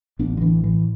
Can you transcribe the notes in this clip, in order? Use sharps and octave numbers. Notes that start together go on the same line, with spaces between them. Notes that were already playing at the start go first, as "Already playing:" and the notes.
A1 B3 D4
D3
E3
A2 E3